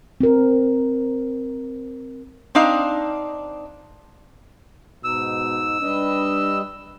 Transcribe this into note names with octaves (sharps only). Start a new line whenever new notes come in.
C4 A#4
C4 D4 D#4 F5
G#2 B2 D#4 E6
G3 D4 B4 D#5